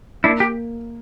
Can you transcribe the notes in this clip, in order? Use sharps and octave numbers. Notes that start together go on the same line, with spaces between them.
A#3 D4 E4
G4